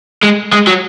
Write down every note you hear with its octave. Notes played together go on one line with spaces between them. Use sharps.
G#3
G#3
F#3